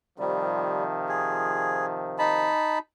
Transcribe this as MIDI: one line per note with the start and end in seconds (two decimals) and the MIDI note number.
0.19 2.49 48
0.19 2.49 51
0.19 2.49 53
0.19 0.84 55
1.09 1.86 68
2.19 2.79 63
2.19 2.79 81
2.19 2.79 83